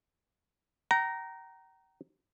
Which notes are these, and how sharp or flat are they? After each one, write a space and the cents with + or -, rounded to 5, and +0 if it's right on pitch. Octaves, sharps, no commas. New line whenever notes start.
G5 -40 A#5 +0